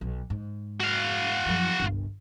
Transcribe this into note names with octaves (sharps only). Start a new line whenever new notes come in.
B1
G#2
F#4 F5
F#2 F3
G1 C2